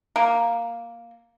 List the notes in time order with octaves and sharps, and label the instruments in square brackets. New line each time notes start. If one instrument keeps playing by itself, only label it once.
[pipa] A#3